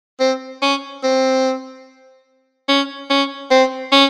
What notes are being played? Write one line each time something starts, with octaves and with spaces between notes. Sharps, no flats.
C4
C#4
C4
C#4
C#4
C4
C#4